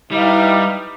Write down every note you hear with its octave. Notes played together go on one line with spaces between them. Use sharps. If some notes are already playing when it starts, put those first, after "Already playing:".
G3 D#4 E4 B4 F5